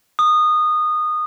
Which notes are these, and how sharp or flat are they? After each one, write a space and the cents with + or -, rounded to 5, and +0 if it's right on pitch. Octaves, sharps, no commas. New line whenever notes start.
D#6 -20